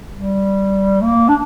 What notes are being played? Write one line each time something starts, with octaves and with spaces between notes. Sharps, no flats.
G3
A#3
D4